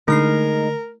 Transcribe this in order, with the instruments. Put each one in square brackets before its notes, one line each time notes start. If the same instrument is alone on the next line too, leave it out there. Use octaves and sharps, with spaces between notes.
[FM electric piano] D3 [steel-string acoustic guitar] G#3 D#4 [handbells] A3 F6 C7 [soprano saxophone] A#4